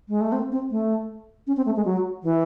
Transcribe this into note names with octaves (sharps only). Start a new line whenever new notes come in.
G#3
A3
C4
C4
A3
C#4
C4
A3
G#3
F#3
E3